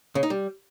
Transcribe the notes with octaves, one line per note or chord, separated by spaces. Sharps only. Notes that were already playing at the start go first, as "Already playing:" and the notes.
C#3
D#4
G3